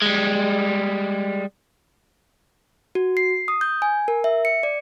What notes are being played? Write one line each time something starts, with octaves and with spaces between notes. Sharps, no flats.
G3 G#3
F#4
C7
D#6
G6
G#5
A#4
E5
C#7
D5